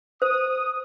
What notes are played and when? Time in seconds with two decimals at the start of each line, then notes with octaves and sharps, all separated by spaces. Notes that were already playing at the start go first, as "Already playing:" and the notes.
0.22 C5 D#6